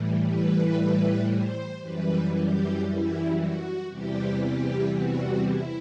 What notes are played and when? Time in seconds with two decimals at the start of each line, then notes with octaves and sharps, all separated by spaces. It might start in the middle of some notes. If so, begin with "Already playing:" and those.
Already playing: A2 E3 G3
0.26 B4
1.29 C5
1.81 F#2 E3 G3 B4
2.34 G4
2.85 E4
3.37 F#4
3.89 E2 C3 E3 G3 G4
4.40 G4
4.91 F#4
5.44 E4